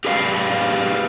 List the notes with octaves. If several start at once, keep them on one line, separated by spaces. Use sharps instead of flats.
G4 G#4 B4 D5 F5